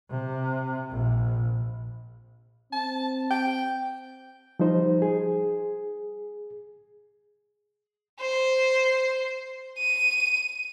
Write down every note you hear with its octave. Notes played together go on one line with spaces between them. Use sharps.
C3
A#1
C4 A5
G5
F3 G3 D#4 C5
G#4
C5
D#7